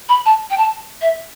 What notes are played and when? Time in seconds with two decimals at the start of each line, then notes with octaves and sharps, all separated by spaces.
0.09 B5
0.26 A5
0.50 G5
0.58 A5
1.01 E5